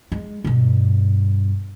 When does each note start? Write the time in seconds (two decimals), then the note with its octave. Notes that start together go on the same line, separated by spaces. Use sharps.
0.12 G#3
0.44 G2 B2